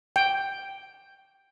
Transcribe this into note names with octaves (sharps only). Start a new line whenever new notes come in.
G5